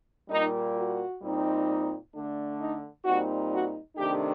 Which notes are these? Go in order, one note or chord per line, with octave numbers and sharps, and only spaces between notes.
A#2 G3 A#3 D#4
F#4
A#2 G3 C4 D#4
D3 A3 D4
D#4
A#2 G3 C4 D#4 F#4
F#4
C3 D#3 A3 D4 G4